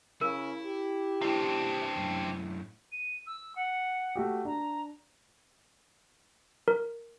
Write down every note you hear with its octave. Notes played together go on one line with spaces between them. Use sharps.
C#3 E4 A#4
G4
C4 D4 E4 E5 C6
F#2 A2
D#7
E6
F#5
A3 F#4 G4
D4 A#5
A#4